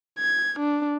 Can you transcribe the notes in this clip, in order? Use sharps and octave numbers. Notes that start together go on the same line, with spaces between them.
G#6
D4